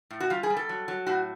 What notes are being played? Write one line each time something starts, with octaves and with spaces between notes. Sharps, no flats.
A2
F#4
G3 F4
G#4
G3
A4
F#3
F#3
A2 F#4